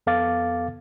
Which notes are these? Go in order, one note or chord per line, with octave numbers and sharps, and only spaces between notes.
F2 B3 A4 F5 D6 A6